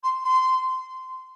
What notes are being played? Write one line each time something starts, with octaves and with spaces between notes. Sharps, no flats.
C6
C6